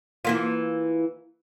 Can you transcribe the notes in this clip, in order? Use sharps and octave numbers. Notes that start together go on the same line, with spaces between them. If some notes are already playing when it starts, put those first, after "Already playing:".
E3 A#3 F4